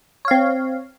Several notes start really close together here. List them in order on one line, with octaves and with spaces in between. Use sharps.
C#5 F5 C4